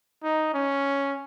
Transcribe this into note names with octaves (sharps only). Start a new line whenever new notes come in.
D#4
C#4